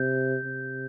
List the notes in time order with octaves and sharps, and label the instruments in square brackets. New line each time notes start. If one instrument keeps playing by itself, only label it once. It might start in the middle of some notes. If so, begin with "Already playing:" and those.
Already playing: [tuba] C3 [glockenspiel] G6
[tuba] C3